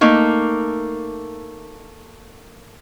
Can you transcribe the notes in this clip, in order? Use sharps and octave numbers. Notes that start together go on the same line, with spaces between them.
A3 A#3 D#4